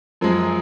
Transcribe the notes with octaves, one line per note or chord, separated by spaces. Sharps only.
F#2 F3 G#3